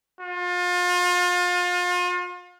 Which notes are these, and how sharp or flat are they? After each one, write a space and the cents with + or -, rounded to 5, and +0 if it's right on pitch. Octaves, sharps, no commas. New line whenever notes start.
F4 +35